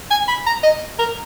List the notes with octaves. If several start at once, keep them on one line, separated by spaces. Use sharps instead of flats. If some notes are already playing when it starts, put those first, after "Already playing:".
G#5
B5
A#5
D#5
A#4